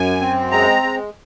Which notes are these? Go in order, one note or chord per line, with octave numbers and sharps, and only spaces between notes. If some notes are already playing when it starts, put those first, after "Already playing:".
Already playing: F#2 G#5
C4
G#3 A#5
G#3